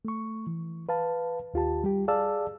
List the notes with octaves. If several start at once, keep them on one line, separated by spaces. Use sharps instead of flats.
A3 C#6
E3
B4 F5 A5
D#2 F4 G4 A5
G3 G4
G#4 D5 F5 A5 E6